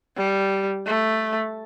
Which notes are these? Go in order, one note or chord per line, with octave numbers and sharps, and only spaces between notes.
G3
A3